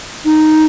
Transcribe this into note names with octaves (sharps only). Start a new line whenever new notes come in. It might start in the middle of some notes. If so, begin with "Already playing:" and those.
D#4